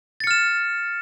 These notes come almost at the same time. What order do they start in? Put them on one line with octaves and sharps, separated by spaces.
A6 C#7 F6 E7